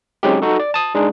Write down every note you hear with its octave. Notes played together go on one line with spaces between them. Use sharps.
F#3 G#3 C4 C#4 D#4 G4
D#4 F#4 A4
D5
A5 D#6
G#3 D4 D#4 G#4